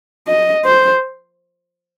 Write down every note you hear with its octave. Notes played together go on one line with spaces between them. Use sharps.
D#5
C5